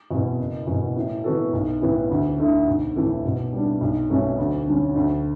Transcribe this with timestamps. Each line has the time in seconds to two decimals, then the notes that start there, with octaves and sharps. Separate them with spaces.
0.11 E2 B2
0.38 F#1
0.67 E2 B2
0.96 A2
1.24 E3 B3 F#4 A4
1.53 B1
1.82 A2 E3 B3
2.10 D2
2.38 D3 A3 E4
2.67 B1
2.96 A2 E3 A3
3.25 B2
3.53 G3 B3 D4
3.81 B1
4.10 B2 F#3 A3 C#4
4.38 D2
4.67 D3 F#3 C#4
4.96 D2